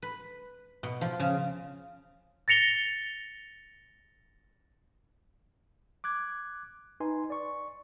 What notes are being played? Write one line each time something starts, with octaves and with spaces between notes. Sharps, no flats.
B4
B2
F3
C#3
A6 A#6 C#7 F7 G7
D6 F#6 G#6
D#4 B4 G#5 C6
D5 C#6